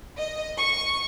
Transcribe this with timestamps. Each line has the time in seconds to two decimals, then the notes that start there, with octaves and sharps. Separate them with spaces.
0.19 D#5
0.56 C#6